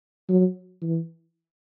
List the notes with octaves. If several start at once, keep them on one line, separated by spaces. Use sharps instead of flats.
F#3
E3